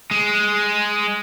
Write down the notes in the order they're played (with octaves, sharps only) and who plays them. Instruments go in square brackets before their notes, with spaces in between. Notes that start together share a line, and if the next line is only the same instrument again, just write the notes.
[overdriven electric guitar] G#3